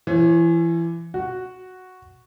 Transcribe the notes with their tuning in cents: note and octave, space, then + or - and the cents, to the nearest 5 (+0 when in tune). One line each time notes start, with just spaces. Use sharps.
E3 +25 C#5 -40
F#4 +0 F#5 +0